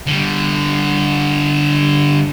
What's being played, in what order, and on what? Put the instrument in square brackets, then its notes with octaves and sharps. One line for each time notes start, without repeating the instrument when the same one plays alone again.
[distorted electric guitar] D3 G3